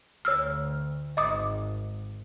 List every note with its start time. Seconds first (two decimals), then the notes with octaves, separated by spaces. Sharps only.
0.25 D2 C#5 E6 F6
1.17 G#1 D#5 D6 D#6